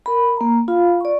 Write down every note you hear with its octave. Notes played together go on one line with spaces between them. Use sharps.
A#4 B5
A#3 A#5
F4 F5 B5
D5 C#6